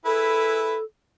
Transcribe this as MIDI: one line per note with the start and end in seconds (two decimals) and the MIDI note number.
0.05 0.77 64
0.05 0.77 68
0.05 0.83 69
0.05 0.77 71